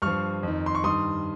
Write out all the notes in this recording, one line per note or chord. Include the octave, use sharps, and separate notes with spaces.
G2 F3 C#6 F6
F2
D#3
C6
C#6
G2 D#3 C6 D#6